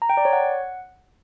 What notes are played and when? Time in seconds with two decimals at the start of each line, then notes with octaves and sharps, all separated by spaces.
0.02 A#5
0.09 G5
0.17 D5
0.25 C#5
0.33 F#5